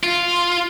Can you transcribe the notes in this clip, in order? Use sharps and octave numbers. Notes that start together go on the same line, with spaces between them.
F4